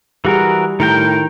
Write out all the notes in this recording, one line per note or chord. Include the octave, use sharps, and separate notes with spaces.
E3 G3 F#4 G#4 A#4
A2 D#3 A#4 G5